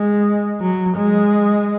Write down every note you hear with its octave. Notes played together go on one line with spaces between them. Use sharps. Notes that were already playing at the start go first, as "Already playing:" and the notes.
Already playing: G#3
F#3
G#3